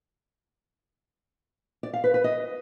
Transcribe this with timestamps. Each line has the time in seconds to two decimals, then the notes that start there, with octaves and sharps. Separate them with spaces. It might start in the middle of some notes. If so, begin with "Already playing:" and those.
1.83 D5
1.93 F5
2.04 B4
2.14 B4
2.24 D#5